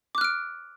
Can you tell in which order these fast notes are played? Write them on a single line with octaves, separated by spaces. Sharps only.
D6 F#6 F6 D7